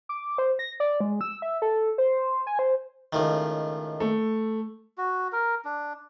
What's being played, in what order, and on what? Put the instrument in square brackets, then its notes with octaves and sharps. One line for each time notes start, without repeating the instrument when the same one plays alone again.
[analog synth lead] D6
C5
A#6
D5
G#3
E6
E5
A4
C5
G#5
C5
[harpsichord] C#2 A2 D#3
[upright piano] A3
[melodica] F#4
A#4
D4